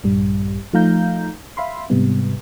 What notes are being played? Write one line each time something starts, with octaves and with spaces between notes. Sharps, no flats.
A#1 G2 G3
F3 A3 D#4 F5 A#5 G6
E5 F5 B5 C6
G#2 C3 G3 B3